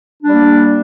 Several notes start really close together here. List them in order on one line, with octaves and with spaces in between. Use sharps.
D4 G3 A#3